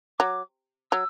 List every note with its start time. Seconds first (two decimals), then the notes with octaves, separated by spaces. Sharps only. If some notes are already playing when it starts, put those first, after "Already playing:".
0.19 F#3 D6
0.91 F#3 E6